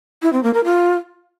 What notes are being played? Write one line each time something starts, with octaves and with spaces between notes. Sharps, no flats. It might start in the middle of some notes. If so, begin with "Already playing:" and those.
E4
C4
A#3
A#4
F4